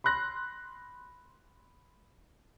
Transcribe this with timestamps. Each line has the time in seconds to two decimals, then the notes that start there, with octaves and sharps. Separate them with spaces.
0.04 B5 C6 F#6 A#6